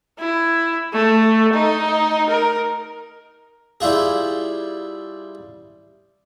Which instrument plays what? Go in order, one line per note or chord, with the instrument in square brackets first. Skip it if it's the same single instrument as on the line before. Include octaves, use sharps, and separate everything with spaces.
[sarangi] E4
A3
D#4
A#4
[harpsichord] G3 E4 F4 G#4